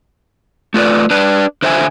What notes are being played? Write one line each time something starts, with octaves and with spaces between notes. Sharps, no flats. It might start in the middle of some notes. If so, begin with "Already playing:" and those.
A3 F4 B4 D5
D4 B4
D3 C5 E5 G#5